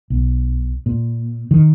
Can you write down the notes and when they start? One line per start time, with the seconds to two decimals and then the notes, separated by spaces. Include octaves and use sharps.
0.10 B1
0.86 A#2
1.51 D#3